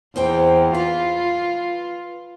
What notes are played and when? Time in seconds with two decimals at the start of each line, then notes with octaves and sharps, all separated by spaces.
0.16 E2 C4 C5 G5
0.74 F4 B4